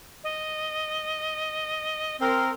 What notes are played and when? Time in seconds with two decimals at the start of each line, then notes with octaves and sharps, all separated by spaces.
0.24 D#5
2.20 C4 A#4 C6